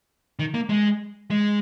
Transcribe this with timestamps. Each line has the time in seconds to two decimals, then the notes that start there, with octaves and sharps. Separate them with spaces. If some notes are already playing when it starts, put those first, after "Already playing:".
0.39 D#3
0.54 A#3
0.69 G#3
1.31 G#3